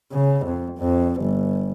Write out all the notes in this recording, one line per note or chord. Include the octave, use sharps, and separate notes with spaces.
C#3
F2
F2
G1